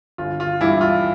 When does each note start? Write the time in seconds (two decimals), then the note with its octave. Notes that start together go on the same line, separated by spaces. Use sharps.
0.18 G1 F4
0.40 F4
0.60 G2 E3 G3 E4
0.81 F4